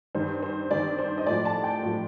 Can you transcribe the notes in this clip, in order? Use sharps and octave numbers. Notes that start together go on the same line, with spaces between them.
G2 D#3 C5
C5
G2 D#3 D5
C5
D#5
A2 F3 D5
A5
G5
A2 F3